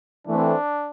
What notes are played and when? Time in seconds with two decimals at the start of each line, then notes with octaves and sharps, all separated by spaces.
0.27 E3 A3 C4 D4